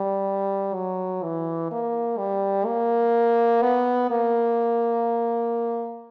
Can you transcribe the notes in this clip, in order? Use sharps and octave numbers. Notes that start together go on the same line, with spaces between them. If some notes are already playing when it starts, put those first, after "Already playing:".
Already playing: G3
F#3
E3
A#3
G3
A#3
B3
A#3